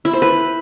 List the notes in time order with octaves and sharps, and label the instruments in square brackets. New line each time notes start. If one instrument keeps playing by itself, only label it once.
[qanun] E4
C5
B4